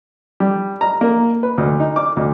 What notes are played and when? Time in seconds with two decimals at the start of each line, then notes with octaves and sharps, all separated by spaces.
0.40 G3
0.81 A#5
1.01 A#3
1.43 B4
1.58 D2
1.80 D#4
1.96 D6
2.17 D2